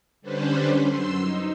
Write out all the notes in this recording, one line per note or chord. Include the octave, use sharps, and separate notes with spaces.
D3 G3 C#4 D4 B4 C5
F#2 C6 E6
D#4